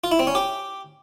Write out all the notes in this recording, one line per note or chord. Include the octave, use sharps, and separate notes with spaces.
F4
E4
C4
C#4
G4